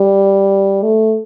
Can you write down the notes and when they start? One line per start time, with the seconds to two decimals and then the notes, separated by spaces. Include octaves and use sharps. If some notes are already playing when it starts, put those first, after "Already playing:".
Already playing: G3
0.83 A3